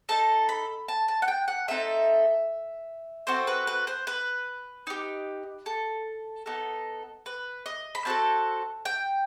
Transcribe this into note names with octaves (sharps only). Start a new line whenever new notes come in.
D#4 A4 A5
B5
A5
A5
F#5
G5
F#5
A3 C4 D#4 A4 E5
C4 F#4 A4 C5
B4
B4
C5
B4
D#4 G4
A4
B3 D#4 A4
B4
D#5
B5
C4 F#4 A4 A5
G5